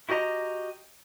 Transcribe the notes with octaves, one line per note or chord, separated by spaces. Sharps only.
E4 F#4 G4 D#5 A#5